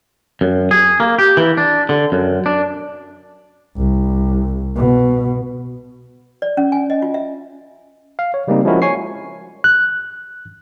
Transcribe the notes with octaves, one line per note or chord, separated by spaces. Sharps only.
F#2
G#4
A#3
G4
E3
D4
D3
F#2
D4
C2
B2
D5
C#4
G#5
D#5
F4
E5
F5
C#5
C#3 G3 G#3 A#3 C4 D#4
F3 G#3 C#4 E4 F#4 A#4
C#5 G#5 C#6 C7
F#6